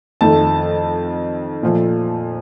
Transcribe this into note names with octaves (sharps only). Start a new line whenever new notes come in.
F2 D#3 A3 A5
A#2 F3 A3